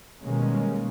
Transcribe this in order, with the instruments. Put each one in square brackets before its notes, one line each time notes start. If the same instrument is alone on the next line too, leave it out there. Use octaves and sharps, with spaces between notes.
[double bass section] B2 D#3 G3 G#3 A#3 C#4